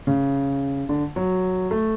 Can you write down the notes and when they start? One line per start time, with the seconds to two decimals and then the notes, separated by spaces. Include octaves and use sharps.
0.07 C#3
0.89 D3
1.16 F#3
1.71 A3